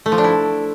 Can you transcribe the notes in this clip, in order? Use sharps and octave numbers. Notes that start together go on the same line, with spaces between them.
A3
F3
D4
E4